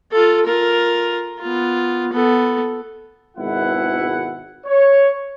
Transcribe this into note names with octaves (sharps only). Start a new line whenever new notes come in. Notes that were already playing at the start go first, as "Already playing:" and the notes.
F4 A4
F4 A#4
B3 F4
B3 A4
G#1 B2 E4 F#5
C#5